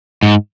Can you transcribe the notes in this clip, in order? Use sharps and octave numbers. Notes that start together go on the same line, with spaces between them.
G#2